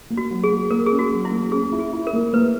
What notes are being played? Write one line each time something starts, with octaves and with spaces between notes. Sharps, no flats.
A#3
F#4
F#3
G#4
A#3
A#3 A#4
C#4 G#4
F#4
F#3
E4
A#3
C#4 G#4
E4
G#4
E4
A#4
A#3
A#3 B4